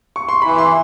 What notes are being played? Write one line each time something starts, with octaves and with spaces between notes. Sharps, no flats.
C#6
C6
E3 B5
C6